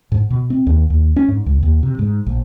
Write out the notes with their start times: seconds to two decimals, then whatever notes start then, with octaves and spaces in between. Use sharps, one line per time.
0.12 G#2
0.30 B2
0.50 C4
0.67 D#2
0.90 D#2
1.16 C#4
1.28 G#2
1.46 C#2
1.63 D#2
1.83 C3
1.99 G#2
2.26 A#1